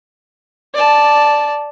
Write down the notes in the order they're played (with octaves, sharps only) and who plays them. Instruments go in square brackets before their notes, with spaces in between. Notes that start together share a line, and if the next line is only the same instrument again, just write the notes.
[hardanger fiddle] D5 A5